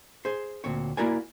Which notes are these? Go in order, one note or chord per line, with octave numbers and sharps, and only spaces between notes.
G#4 C5
D2 A#2 C4 C#5
A#3 E4 F#4 A#4 D5 G#5